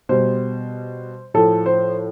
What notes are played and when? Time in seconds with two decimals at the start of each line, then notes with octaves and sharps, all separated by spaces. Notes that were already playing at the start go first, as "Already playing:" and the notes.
0.09 B2 G3 C5
1.34 A2 F3 A4
1.66 C5